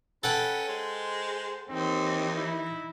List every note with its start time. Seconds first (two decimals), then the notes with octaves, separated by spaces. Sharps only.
0.23 C#4 A4 B4 F#5 G5
0.69 G#3 C5
1.69 D#2 E3 C4 D#4
2.37 E4